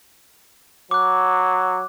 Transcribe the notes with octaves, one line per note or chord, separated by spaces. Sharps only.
F#3 D6 F#6